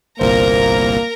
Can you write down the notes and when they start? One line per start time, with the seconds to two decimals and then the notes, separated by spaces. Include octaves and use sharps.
0.20 G1 C2 A#2 A#3 A#4 C5 A#5